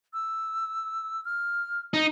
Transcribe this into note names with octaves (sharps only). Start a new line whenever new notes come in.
E6
F6
D#4